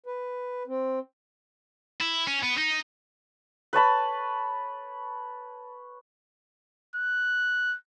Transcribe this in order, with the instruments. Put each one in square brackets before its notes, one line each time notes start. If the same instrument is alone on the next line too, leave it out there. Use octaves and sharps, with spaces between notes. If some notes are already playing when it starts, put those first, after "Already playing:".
[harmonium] B4
C4
[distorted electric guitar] E4
C#4
B3
D#4
[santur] B4 C#5 A5 B5
[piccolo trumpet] F#6